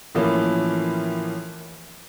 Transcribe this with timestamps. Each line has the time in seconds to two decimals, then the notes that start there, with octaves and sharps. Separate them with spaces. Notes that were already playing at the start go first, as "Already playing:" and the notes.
0.15 A2 E3 F3 A#3 C#4